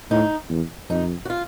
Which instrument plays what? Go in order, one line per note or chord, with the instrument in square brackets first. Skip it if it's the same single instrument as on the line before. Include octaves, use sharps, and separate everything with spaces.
[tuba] A2 [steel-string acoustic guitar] D#4
[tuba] E2
[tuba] F2 [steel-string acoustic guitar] D#4
[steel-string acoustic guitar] F#4
F4